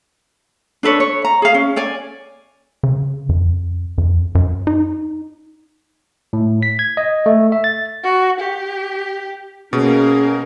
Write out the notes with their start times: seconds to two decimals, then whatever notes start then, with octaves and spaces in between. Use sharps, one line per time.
0.83 D4 A4 B4 C#5
1.00 C#5
1.25 A#5
1.42 G#4 F5
1.54 C#4
1.76 C#5 D5 G#5
2.83 C#3
3.29 F2
3.98 F2
4.35 F#2
4.67 D#4
6.33 A2
6.63 B6
6.79 G#6
6.97 D#5
7.26 A3
7.52 E5
7.64 A6
8.04 F#4
8.40 G4
9.73 B2 A#3 C#4 G#4 A#4